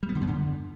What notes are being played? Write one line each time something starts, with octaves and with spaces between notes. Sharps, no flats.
G3
B3
D3
F#2
D3